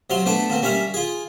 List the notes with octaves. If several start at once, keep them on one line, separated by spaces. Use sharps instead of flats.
C3 F#3 F5 C6
A3 B3 D4 A4
B2 A#3 C4
G3 C#4 A#4 E5 F5
F4 G#4